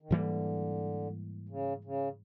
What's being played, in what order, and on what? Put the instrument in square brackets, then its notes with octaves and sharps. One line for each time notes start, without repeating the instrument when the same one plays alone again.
[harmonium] D#3
[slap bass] G#2 E3 G3 A#3 [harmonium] D3
[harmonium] C#3
C#3